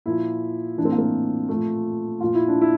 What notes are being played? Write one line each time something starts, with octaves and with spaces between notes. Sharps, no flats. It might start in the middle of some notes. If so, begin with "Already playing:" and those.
A#2 F3 E4
A2 E3 C4 D4
A#3
C4
A#2 F3 A3
A#2 F3 F4
E4
D4
E4